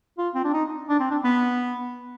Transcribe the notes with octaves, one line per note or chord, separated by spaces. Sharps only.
F4
C4
D4
D#4
D4
C4
D4
B3